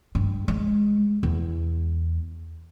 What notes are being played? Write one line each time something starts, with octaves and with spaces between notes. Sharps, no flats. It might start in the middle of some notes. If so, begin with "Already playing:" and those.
G2
G#3
E2